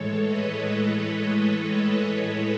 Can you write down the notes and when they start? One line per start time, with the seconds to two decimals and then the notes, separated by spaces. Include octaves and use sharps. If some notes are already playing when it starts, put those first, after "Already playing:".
Already playing: A2 E3 G#3 A4 C#5
0.25 B4 D#5